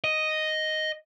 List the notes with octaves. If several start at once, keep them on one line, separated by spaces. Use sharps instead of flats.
D#5